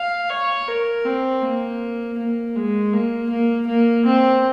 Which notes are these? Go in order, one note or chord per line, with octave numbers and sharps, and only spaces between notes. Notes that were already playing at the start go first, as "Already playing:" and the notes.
Already playing: F5
C#5
A#4
C4
A#3
A#3
G#3
A#3
A#3
A#3
C4